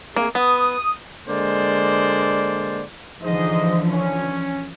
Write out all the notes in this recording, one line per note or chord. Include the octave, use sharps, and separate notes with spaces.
A3 A#3 C4 G#4
B3 D#6
D3 G#3 A#3 C5 D5
G#2 D3 E3 F3 C5 D#5
C#4